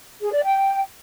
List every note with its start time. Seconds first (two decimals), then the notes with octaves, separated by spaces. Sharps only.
0.21 G#4
0.32 D5
0.44 G5